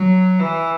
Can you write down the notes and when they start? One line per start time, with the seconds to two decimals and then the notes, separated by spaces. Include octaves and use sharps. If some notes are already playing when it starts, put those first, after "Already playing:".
Already playing: F#3
0.39 E3